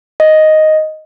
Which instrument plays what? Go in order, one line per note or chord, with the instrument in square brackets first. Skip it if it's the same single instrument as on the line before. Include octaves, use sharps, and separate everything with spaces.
[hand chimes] D#5